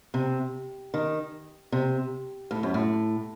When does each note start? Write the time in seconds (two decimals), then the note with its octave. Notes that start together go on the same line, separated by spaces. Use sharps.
0.14 C3
0.94 D#3
1.72 C3
2.51 A2
2.63 F#2
2.74 A2